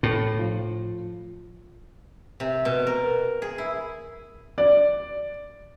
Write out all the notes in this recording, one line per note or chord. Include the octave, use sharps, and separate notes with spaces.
A2
F3
C3
B2
A#4
G#4
E4
D5